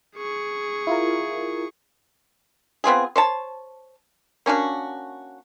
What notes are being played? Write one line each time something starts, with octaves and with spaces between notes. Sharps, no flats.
G#4 C#6
E4 F4 A#4
B3 C4 F4 G#4
C5 C#5 A5
A#3 C#4 D4 F#4